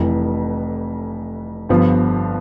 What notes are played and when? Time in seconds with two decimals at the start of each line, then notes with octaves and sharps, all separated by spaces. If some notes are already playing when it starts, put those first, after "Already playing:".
Already playing: F1 F2 E3
1.69 G1 G2 F3 B3